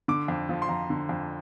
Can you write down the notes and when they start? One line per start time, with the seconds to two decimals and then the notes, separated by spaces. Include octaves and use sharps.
0.08 D3 D6
0.28 F2
0.49 F3
0.62 C6
0.69 F2 A#5
0.90 D3
1.09 F2